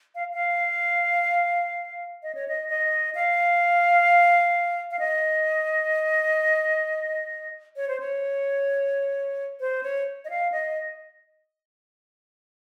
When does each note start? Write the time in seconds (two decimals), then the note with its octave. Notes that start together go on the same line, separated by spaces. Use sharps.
0.15 F5
0.34 F5
2.23 D#5
2.35 C#5
2.48 D#5
2.69 D#5
3.15 F5
4.91 F5
4.99 D#5
7.76 C#5
7.88 C5
8.00 C#5
9.60 C5
9.83 C#5
10.25 D#5
10.30 F5
10.52 D#5